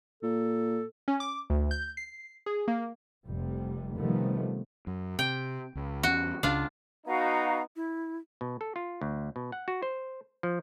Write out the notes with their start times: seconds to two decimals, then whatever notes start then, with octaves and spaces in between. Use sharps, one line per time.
0.23 A#2 A4
1.08 C#4
1.20 D6
1.50 D2
1.71 G6
1.97 C7
2.46 G#4
2.68 A#3
3.26 F1 C3 G3
3.97 C3 D#3 F3 G3 A3 B3
4.87 F#2
5.19 C3 G5
5.75 C#2
6.03 E2 C#4 F#4
6.43 C#2 C#3 D4 F4
7.07 B3 D#4 F#4 F5 A#5
7.76 E4
8.41 B2
8.61 A4
8.76 F4
9.01 D2
9.36 B2
9.52 F#5
9.68 F#4
9.82 C5
10.43 F3